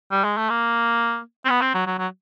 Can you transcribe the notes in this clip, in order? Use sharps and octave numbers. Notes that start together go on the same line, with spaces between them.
G3
G#3
A3
A#3
C4
B3
C4
F#3
F#3
F#3